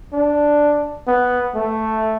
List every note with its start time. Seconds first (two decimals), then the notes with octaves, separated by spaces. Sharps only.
0.13 D4
1.07 B3
1.55 A3